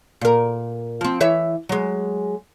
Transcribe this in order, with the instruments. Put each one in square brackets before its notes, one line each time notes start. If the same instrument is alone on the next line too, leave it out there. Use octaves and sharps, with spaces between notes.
[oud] A#2 A#4
F3 C4
E3 C#5 E5
F#3 G#3